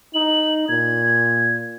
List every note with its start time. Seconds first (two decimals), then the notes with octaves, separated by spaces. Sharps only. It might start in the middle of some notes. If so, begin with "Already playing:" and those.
0.14 D#4 F#7
0.69 A#2 G#6